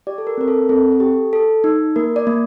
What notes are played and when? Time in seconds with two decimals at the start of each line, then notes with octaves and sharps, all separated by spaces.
0.07 G4 D5
0.18 A4
0.27 A#4
0.38 C4 A#4
0.48 A4
0.69 C4 A4
0.92 A4
1.00 G4
1.33 A4
1.64 D#4
1.96 A#3 A#4
2.16 D5
2.27 A#3